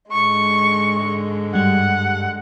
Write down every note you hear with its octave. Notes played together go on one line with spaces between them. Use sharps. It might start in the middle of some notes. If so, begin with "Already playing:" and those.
G#2 D3 G#3 C#6
G2 G3 F#5